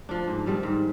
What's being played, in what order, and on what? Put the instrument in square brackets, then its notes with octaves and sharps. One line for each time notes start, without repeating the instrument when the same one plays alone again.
[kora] F3 A3 D4
G#2
D#3 G3 C4
G#2